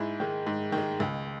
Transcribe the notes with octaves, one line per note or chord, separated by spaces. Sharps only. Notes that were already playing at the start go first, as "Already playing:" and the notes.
Already playing: G#2 E4 G#4
D#3 G#3
G#2
D#3
G#3
C#2